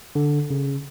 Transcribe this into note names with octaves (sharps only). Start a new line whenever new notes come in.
D3
C#3